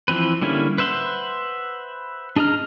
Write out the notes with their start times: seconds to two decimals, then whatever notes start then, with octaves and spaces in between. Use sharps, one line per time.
0.08 E3 F3 C4 B4
0.42 D3 G3 A#3 C#4 E4
0.78 B4 C5 E5 F#5 C6
2.36 D4 G#4 D#5 A#5 F6